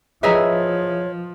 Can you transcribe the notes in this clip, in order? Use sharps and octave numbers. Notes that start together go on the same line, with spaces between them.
F3 E4 G#4 B4 C#5 D#5 E5 A#5